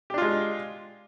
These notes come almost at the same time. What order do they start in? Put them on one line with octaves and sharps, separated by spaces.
G4 D4 F4 G#3